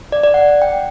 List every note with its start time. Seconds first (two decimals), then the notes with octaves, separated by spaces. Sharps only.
0.12 D5
0.24 D5
0.34 F#5
0.48 F#5
0.62 G5